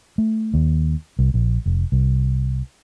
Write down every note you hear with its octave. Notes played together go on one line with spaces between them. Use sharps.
A3
D#2
C2
A#1
F1
C2